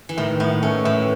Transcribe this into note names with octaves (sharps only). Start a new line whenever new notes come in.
E3
A2 D#3
A2 B3
A3 C#4
A2 E3